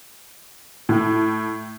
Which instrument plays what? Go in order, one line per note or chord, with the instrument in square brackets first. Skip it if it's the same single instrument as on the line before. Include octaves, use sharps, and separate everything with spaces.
[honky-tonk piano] A2